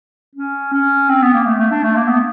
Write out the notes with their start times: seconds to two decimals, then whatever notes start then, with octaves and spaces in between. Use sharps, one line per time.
0.36 C#4
0.73 C#4
1.09 C4
1.22 B3
1.34 A#3
1.46 A3
1.59 A3
1.71 D4
1.83 A3
1.96 A#3
2.08 B3